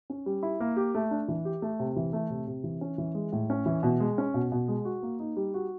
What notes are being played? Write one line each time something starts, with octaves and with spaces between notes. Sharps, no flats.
C#4
G3
E4
A#3
G4
A3
D4
E3
G4
A3
C3
E3
A3
C3
C3
E3
C#4
E3
G#3
A2
C#4
E3
B2
G#3
C#4
B2
B2
G#3
F#4
A#3
D#4
G3
F#4